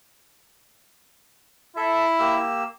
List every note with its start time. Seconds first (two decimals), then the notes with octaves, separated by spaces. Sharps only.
1.76 E4 A4 E5
2.19 A#3 G4 E6